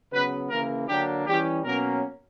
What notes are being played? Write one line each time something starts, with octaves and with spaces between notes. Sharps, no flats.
C#3 F#3 B3 B4
C#3 E3 A#3 A#4
D3 F#3 A#3 D4 G4
E3 G3 C#4 G4
B2 F#3 A#3 C#4 A#4